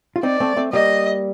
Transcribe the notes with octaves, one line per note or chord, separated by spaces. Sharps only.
F4
C4 D#4 D5
A3 C4
A3 C4
G3 A#3 D#5